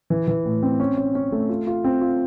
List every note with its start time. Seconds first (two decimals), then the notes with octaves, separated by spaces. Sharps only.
0.10 E3
0.28 E3
0.45 A2
0.63 C4
0.80 C#4
0.97 C#4
1.15 C#4
1.32 A3
1.49 F4
1.67 F4
1.84 C4
2.01 F4